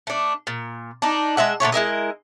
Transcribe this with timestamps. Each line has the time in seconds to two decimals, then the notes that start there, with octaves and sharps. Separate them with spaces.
0.07 A3 D4
0.47 A#2
1.02 D4 D#4
1.37 G#3 D#5 E5 F#5
1.60 A#2 D3 A3 C#5
1.72 G#3 E4 A#4 D#5